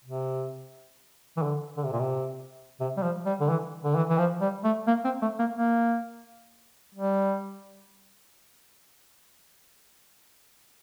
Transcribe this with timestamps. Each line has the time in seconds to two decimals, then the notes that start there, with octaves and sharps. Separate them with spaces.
0.04 C3
1.37 E3
1.42 D3
1.77 D3
1.85 C3
1.92 A#2
2.00 C3
2.80 C3
2.97 G3
3.03 F3
3.26 G3
3.40 D3
3.49 E3
3.84 D3
3.95 E3
4.10 E3
4.18 F3
4.41 G3
4.64 A3
4.87 A#3
5.04 C4
5.22 A3
5.39 A#3
5.56 A#3
6.94 G3